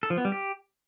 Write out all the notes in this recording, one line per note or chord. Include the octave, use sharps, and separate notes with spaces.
A4
F3
B3
G3
G4